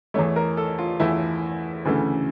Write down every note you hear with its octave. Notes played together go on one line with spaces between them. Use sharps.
E2 E3 A3 C#5
A#4
A4
F4
E2 E3 A3 E4
D2 C#3 E3 A3